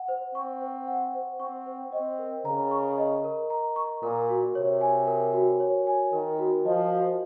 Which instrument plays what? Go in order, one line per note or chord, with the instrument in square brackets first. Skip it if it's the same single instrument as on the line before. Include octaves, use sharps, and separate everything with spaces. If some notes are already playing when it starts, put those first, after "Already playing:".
Already playing: [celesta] F#5
C5
[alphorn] C4 [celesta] C#6
[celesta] C5
F#5
C5
[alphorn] C4 [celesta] C#6
[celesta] C5
[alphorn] C4 [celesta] D#5
[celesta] A#4
[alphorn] C#3 [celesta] A#5
[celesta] C#6
D#5
A#4
A#5
C#6
[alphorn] A#2 [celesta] A#4
[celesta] F#4
[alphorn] C3 [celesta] C#5
[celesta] G#5
A#4
F#4
C#5
G#5
[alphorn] D#3 [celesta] A#4
[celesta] F#4
[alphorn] F3 [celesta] D#5
[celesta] F#4